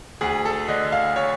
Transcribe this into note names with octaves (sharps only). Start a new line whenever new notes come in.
D2 G#4
A4
D3 D#5
F5
C#5